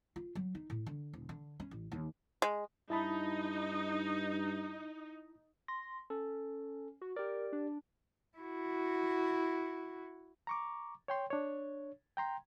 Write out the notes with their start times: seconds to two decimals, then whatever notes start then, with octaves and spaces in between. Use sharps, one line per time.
0.16 F4
0.35 F#3
0.55 D#4
0.70 A2
0.86 D3
1.13 E1
1.29 D3
1.60 C#4
1.71 A1
1.92 D#2
2.42 G#3
2.90 G2 D#4 E4 A5 B5
5.68 C6 A#6
6.10 C#4 A4
7.02 F#4
7.16 G4 A#4 D5
7.53 D4
8.38 E4 F#4
10.47 A#5 C#6 D6
11.08 C#5 G5 C6
11.30 D4 C#5
12.17 G5 A#5 C6